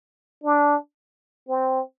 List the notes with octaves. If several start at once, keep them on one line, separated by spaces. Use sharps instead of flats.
D4
C4